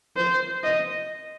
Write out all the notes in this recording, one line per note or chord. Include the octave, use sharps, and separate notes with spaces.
C5
D#5